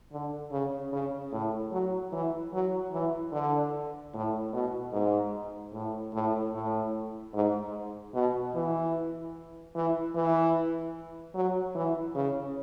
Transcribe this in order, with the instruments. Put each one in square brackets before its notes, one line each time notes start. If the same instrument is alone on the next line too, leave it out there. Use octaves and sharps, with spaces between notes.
[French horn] D3
C#3
C#3
A2
F#3
E3
F#3
E3
D3
A2
B2
G#2
A2
A2
A2
G#2
B2
E3
E3
E3
F#3
E3
C#3